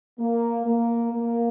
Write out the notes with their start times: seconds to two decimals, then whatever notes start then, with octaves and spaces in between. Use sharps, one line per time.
0.19 A#3
0.65 A#3
1.12 A#3